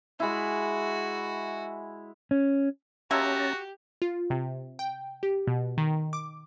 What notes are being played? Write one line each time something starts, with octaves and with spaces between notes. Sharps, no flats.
G#3 E4 F#4
C#4
G#3 A#3 C#4 F#4 G4 E5 A5 A#5
F4
C3
G5
G4
B2
D#3
D6